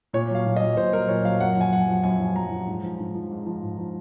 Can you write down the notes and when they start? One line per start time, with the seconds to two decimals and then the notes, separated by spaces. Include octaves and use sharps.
0.13 A#2 C#5
0.30 F#3 F5
0.46 A#2
0.57 D#5
0.61 F#3
0.77 A#2 C5
0.93 F#3 A#4
1.08 A#2 C#5
1.25 F#3 F5
1.40 F#2 F#5
1.57 F3 G#5
1.73 F#2 F#5
1.88 F3
2.03 F#2 G#5
2.19 F3
2.36 F#2 A#5
2.51 F3
2.68 G#2
2.83 F3
2.99 G#2
3.15 F3
3.31 G#2
3.47 F3
3.62 G#2
3.78 F3